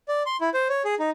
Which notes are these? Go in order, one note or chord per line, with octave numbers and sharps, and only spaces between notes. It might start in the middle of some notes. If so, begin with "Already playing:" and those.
D5
C6
E4
C5
C#5
G#4
D#4